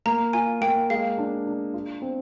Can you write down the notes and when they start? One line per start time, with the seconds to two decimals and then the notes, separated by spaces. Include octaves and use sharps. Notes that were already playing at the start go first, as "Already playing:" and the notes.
0.06 A#3 A#5
0.33 F4 G#5
0.61 A#3 G5
0.90 G#3 F5
1.18 D4
1.46 D4
1.74 F4
2.02 C4